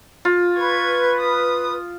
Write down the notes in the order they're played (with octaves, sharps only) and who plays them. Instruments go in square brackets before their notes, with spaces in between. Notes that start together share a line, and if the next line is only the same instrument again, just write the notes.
[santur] F4
[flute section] B4 [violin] C#6 G#6
[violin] D#6